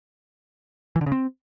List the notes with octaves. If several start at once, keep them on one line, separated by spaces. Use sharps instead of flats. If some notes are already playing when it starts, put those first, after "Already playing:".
E3
D3
C#3
C4